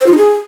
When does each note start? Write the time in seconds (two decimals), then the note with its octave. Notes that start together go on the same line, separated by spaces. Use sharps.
0.01 C5
0.06 F4
0.12 D#4
0.17 G#4